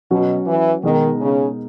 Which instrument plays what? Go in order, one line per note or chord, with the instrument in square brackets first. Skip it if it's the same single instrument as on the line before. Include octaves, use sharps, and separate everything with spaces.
[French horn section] B2 [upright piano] F#3 C#4 F#4
[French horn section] E3
[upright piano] B2 G#3 D#4 A#4 D#5 [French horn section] D#3
[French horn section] C#3